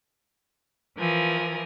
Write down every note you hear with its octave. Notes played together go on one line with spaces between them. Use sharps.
E3 F3 A#4 G#5